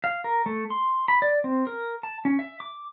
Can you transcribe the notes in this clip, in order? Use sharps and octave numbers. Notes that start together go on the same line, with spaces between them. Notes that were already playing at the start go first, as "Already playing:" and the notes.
F5
A#4
A3
C6
B5
D5
C4
A#4
A5
C#4
E5
D6